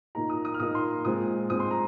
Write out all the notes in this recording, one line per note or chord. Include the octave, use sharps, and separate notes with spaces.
A#2 A#3 D#4 A#5
D#6
D#6
F6
A#2 A#3 D#4 D#6
C6
A#2 G#3 C4 D#6
A#2 G#3 C4 D#6
C6
A#5